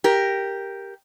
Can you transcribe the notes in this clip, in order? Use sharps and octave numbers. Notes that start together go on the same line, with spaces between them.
G4 A#4